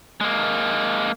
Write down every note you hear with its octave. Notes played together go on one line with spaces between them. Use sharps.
G#3 A#3